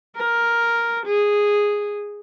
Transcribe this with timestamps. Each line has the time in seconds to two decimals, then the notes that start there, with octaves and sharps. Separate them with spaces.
0.17 A#4
1.06 G#4